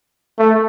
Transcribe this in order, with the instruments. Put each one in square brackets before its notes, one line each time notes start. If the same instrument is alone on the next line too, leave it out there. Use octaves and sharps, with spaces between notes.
[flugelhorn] A3